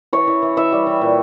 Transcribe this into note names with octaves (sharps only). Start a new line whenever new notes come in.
E3 C#5
E3
E3
E3 E5
G3
E3
A#2